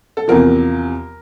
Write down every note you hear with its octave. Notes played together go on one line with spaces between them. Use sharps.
A4
E2 C3 F3 A#4